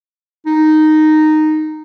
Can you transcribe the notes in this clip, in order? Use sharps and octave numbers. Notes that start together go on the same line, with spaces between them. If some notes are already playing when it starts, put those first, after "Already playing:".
D#4